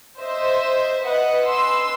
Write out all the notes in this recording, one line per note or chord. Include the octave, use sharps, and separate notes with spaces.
C5 D#5 E5
B4 D#5 F#5
B4 G#5 C6 E6